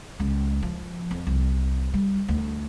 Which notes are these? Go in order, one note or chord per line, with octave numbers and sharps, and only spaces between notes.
C#2
F3
F2
C2
G3
D2